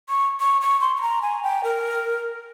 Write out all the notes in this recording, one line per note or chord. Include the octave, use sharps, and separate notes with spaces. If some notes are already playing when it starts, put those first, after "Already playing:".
C#6
C#6
C#6
C6
C6
A#5
G#5
G5
A#4